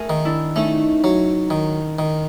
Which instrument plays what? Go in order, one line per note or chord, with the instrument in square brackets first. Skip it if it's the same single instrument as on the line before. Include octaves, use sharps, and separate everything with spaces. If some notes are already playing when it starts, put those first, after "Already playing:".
Already playing: [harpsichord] A3 [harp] G#4 A#4
[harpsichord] D#3
[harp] D4 E4
[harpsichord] A3 [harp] C#4 D#4
[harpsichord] F#3
D#3
D#3